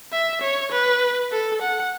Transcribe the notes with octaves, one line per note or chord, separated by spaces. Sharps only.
E5
C#5
B4
A4
F#5